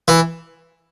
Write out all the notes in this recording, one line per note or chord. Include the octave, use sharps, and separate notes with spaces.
E3